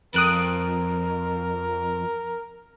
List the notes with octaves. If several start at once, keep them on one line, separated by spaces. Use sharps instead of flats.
F2 A#4 D#6 F#6 D7